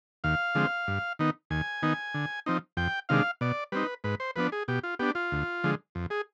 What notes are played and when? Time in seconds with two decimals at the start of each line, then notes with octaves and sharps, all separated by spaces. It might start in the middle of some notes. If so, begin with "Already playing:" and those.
0.24 D#2 F5
0.55 D3 F3 G#3 C4
0.88 G2
1.19 D#3 B3 D#4
1.50 D#2 G#5
1.83 D#3 B3 D#4
2.14 D3
2.46 F3 C4 D#4
2.77 F2 G5
3.09 C3 D#3 G#3 D4 F5
3.41 B2 D5
3.72 G3 C4 D#4 B4
4.04 G#2 B4
4.20 C5
4.36 F3 B3 D4 B4
4.52 G#4
4.68 B2 G4
4.83 F4
4.99 B3 D4 G4
5.15 F4
5.32 D2
5.64 D3 F3 G#3
5.95 F2
6.10 G#4